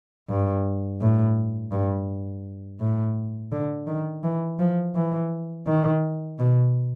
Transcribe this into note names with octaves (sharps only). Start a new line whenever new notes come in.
G2
A2
G2
A2
D3
D#3
E3
F3
E3
D#3
B2